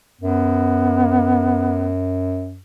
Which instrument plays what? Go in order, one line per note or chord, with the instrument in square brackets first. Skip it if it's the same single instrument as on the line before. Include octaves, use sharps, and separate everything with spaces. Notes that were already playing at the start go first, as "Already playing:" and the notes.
[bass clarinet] F#2 [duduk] B3